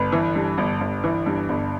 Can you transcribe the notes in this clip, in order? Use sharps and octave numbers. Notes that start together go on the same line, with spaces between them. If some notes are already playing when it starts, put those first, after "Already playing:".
Already playing: G1 B4
E3
G2
G1
G1
E3
G2
G1